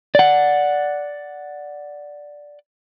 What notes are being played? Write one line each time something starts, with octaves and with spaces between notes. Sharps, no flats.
D5 F#5